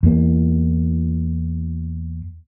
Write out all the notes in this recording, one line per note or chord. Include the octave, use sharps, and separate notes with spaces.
E2 A#3